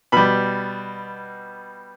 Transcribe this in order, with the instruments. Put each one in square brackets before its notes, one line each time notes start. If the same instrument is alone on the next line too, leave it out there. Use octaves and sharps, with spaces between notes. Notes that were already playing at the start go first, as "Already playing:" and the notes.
[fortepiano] B2 G3 B5